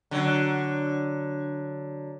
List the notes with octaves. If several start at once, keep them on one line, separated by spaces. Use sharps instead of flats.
D3 F#3